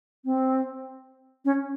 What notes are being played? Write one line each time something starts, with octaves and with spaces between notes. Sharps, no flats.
C4
C#4